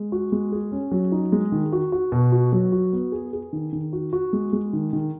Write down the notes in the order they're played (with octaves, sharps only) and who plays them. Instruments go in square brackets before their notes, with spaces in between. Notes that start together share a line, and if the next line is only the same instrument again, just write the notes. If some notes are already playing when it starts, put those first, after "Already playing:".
Already playing: [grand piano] G#3
F#4
G#3
G#4
C#4
F#3
D#4
G#3
D#3
F#4
F#4
B2
F#4
F#3
F#4
B3
G#4
G#4
D#3
D#3
F#4
F#4
G#3
G#3
D#3
D#3